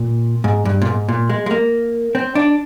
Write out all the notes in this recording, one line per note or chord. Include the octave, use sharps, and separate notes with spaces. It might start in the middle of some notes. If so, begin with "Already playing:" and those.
Already playing: A#2
G#2
G2
A#2
G#2
A#2
G#3
G#3
A#3
C4
D4